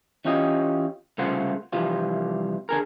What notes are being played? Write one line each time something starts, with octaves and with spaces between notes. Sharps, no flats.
E3 C#4 F4 G4 D#5
C2 C#3 A3 F4 C5 F#5
C2 C3 E3 F3 G3 F4
D3 G#4 A#4